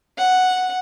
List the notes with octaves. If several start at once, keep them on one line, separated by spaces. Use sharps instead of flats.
F#5